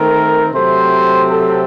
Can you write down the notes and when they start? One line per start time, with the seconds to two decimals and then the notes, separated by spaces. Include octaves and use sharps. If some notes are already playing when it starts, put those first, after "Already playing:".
Already playing: D#3 A3 C4 A#4
0.53 C3 F#3 A3 C4 C5
1.28 A4